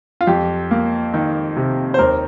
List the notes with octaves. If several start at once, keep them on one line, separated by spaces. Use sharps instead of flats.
F4
F2 G4
A#3
D#3
C3
C5
D#2 A#4